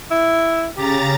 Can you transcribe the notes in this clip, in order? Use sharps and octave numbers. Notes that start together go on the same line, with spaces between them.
E4
C#3 G4 A#5 A6